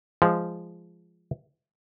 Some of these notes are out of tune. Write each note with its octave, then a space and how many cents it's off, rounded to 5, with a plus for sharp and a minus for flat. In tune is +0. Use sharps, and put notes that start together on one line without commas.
F3 -15 G#3 -10